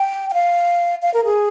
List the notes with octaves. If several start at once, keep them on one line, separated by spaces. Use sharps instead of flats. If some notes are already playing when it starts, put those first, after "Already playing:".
Already playing: G5
G5
F5
F5
A#4
G#4